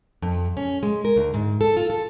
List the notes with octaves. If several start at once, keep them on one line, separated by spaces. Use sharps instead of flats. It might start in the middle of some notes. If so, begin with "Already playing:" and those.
F2
C#4
G#3
A#4
D2
G#2
A4
F4
A4